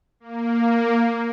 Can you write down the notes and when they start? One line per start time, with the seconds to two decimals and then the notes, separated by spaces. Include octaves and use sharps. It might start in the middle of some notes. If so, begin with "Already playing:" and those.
0.20 A#3